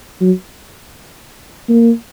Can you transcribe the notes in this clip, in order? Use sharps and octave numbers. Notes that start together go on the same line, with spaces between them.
F#3
A#3